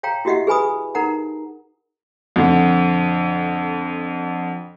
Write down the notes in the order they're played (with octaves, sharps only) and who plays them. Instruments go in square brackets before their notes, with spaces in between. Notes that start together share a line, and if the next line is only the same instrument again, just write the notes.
[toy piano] C#5 F5 G5 A#5
E4 F#4 G4 D#5 E5 F#5
G#4 B4 G#5 B5 D#6
D#4 A#4 F#5 A#5
[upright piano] F2 D3